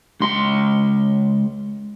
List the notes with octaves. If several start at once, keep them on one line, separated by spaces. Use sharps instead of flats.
C#2 C6